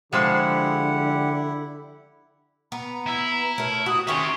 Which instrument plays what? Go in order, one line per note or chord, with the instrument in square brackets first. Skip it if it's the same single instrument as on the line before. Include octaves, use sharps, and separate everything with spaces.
[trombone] D3 [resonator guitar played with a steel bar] F3 G#3 C5 [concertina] E4 [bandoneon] G4 F#5
[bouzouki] B3 [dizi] A#5
[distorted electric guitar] E4 [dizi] A#5
[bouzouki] A3 A#4 [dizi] C#5
[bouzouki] F#4 [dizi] D#6
[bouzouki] D#3 C#4 G#4 [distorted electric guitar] E5 C6 [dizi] C#6